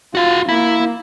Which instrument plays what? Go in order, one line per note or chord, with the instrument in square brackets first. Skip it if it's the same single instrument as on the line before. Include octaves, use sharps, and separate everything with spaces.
[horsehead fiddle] F4 [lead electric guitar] F#4 F5
[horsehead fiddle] A#3 [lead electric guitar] E4